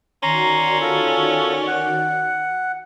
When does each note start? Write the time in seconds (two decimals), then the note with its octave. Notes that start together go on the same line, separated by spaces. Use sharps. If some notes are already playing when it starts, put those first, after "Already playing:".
0.23 D#3 C#4 F#4 D5 A#5 C6
0.81 F4 A4
1.67 F#5